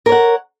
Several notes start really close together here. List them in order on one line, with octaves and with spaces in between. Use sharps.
A#4 C#5 F#5